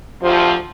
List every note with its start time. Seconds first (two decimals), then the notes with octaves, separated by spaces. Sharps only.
0.21 D2 C3 F3